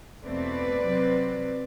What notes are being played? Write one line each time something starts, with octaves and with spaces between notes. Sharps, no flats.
E2 B2 A3 C4 B4 D5
C3 F#3 C4